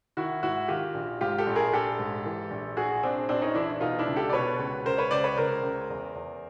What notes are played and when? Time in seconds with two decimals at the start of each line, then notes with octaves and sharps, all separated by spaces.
0.17 D#3 E4 F#4
0.43 G#2 E4 F#4
0.68 D#3 F4 G4
0.94 A#1
1.21 G#2 F4 G4
1.38 G4 A4
1.47 A#1
1.55 G#4 A#4
1.73 A#1 G4 A4
1.99 G#2
2.26 E3
2.51 A#1
2.76 A#1 F#4 G#4
3.03 A#1 C4 D4
3.29 A#1 C4 D4
3.42 C#4 D#4
3.55 E3 D4 E4
3.81 B2 D#4 F4
3.99 D4 E4
4.07 C#2
4.16 G4 A4
4.29 D5
4.33 B2 B4 C#5
4.59 C#2
4.85 C#2 A#4 C5
4.98 B4 C#5
5.11 C#2 C5 D5
5.24 B4 C#5
5.37 C#2 A#4 C5
5.63 C#2
5.90 E2
6.15 E2